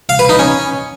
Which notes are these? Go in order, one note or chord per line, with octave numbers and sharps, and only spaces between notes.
F5
B4
D#4
C#4